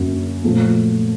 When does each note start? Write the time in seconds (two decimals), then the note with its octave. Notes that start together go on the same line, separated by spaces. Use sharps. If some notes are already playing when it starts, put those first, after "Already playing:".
Already playing: F#2 D3 F#3 A#3 C#4
0.44 A#2 F3 A3